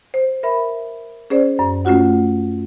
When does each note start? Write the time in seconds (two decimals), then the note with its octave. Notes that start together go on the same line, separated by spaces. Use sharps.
0.14 C5
0.43 A#4 E5 B5
1.30 C#4 G#4 C5 D5
1.59 F#2
1.85 A3 C#4 F4 F#4 F#5